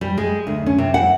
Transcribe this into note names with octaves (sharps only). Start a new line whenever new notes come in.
G3
G#3
D2
C#4
C3
F#5